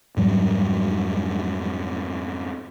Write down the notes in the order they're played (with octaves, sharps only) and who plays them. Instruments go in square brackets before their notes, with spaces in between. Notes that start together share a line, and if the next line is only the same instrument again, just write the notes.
[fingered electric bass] F2 G#2 F#3 G3